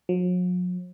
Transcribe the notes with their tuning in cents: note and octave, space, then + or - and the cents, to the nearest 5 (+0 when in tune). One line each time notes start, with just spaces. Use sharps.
F#3 -45